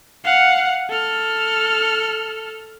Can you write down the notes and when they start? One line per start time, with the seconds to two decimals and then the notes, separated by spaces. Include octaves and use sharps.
0.24 F5 F#5
0.89 A4 F6